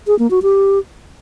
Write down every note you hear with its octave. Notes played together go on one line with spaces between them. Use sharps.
G#4
A#3
F#4
G4